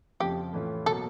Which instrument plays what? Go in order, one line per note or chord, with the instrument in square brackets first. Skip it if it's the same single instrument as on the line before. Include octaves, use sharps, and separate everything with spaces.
[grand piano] F2 C#3 F3 [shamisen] G4
[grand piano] A2 E3 A3 C#4 F4
[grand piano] B2 F#3 A#3 [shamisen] A4